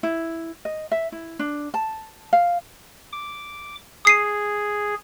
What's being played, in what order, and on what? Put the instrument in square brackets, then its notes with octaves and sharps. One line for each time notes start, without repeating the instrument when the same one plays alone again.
[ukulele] E4
D#5
E5
E4
D4
A5
F5
[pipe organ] D6
[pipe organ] G#4 [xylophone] D#6 C7 D#7